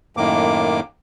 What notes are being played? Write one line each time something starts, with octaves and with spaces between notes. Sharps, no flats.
F#2 A2 D#3 A#3 D6